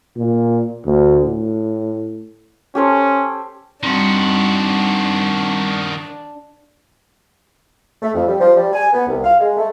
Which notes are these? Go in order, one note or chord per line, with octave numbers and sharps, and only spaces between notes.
A#2
D2
A2
C#4 G4 A4 C5
D#3 G3 C4 D4 F#4
A3
F2
G3
F3
G3
G#5
B3
C2
F5
G#3
A3